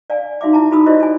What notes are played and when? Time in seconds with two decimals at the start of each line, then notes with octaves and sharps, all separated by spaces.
0.10 D5 F5 G#5
0.41 D#4 F#4 E5 F5 D6
0.53 E4 A5 A#5
0.71 D#4 F#4 A4 B5 D#6 E6
0.86 E4 F#4 G4 C5 D5 D#5
1.00 A4 G#5